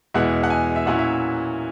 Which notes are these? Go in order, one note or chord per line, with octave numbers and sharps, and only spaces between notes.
E2 B2 G#3 B3 E4 F#5
F#5
G#5
E5
A#2 F#3 C#4 E4 F#5
E5